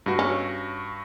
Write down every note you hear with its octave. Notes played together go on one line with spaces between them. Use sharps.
G2 F#4
C#4